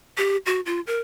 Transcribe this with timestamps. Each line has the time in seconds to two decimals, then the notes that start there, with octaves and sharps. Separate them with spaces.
0.18 G4
0.46 F#4
0.66 F4
0.87 A#4